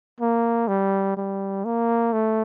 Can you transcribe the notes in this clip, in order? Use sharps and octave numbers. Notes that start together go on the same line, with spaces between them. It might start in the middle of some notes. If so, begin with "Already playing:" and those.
A#3
G3
G3
A#3
A3